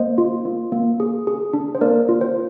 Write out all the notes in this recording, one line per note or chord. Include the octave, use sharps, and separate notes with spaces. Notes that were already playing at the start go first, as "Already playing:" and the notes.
Already playing: A#3 C5 D#5
F4
A#3
A#3
G#4
G#4
D4
C5
A#3 A#4 D5
F4
C5